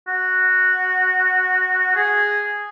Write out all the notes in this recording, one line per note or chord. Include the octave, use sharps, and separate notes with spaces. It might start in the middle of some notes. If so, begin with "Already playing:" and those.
F#4
G#4